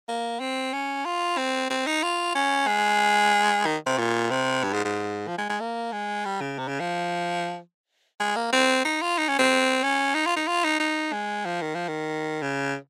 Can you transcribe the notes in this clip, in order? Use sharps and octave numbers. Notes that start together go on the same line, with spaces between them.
A#3
C4
C#4
F4
C4
C4
D#4
F4
C#4
G#3
D#3
C3
A#2
C3
G2
G#2
G#2
F3
G#3
G#3
A#3
G#3
G3
C#3
C3
C#3
F3
G#3
A#3
C4
D#4
F4
D#4
C#4
C4
C#4
D#4
F4
D#4
F4
D#4
D#4
G#3
F3
D#3
F3
D#3
C#3